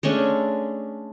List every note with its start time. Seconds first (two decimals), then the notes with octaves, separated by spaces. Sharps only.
0.03 G#3 A3 C#4 D4